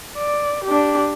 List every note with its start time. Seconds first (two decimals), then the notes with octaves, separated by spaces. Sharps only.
0.17 D5
0.65 D4 G4